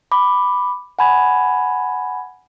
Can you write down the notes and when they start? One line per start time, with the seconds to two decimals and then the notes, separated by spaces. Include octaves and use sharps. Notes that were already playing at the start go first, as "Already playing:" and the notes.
0.12 B5 D6
0.99 F#5 G#5 B5 G#6